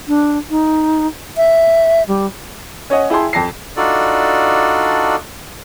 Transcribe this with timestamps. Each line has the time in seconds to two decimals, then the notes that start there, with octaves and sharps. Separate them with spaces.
0.08 D4
0.50 D#4
1.37 E5
2.08 G3
2.90 C#4 C#5 D#5 F#5
3.10 E4 G#4 G5 A5 C6
3.33 F2 A5 A#6 C7
3.77 D4 D#4 F4 F#4 A4 D5